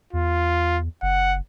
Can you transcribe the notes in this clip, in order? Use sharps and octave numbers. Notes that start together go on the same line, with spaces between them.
E2 F4
F#1 F#5